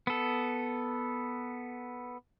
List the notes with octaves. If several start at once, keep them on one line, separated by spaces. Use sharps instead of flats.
B3 A4